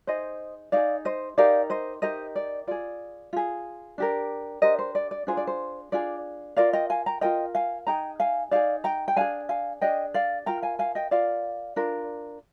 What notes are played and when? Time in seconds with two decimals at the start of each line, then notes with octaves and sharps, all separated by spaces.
0.07 D#4 G#4 C5 D#5
0.72 D#4 G#4 D5 F5
1.05 C5 D#5
1.37 D#4 G4 A#4 D5 F5
1.70 C5 D#5
2.02 D#4 G4 A#4 C5 D#5
2.36 D5
2.67 F4 G#4 D5
3.33 F4 G#4
3.98 D4 G4 A#4
4.62 D4 G4 A#4 C5 D#5
4.79 C5
4.95 D5
5.11 D5
5.27 D4 F4 G#4 C5
5.37 D5
5.47 C5
5.92 D4 F4 G#4 D5
6.56 F4 A#4 D5 F5
6.73 D#5 G5
6.90 F5 G#5
7.06 G5 A#5
7.21 F4 A#4 D#5 G5
7.55 F5 G#5
7.87 D#4 G#4 G5 A#5
8.20 F5 G#5
8.51 D#4 G#4 D5 F5
8.84 G5 A#5
9.08 G5
9.17 D4 G#4 F5 G#5
9.49 F5 G#5
9.81 D4 G#4 D#5 G5
10.14 D5 F5
10.46 F4 A#4 G5 A#5
10.62 F5 G#5
10.79 F5 G#5
10.95 D#5 G5
11.11 F4 A#4 D5 F5
11.76 D4 F4 A#4